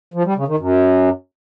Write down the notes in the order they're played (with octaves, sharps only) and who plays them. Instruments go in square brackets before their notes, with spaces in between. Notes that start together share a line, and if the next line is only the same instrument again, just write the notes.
[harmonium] F3
G3
C#3
D#3
F#2